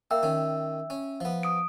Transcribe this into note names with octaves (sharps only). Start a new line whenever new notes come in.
A#3 E5 G5 E6
D#3 C#4
C#4
F3 B3
D#6 D7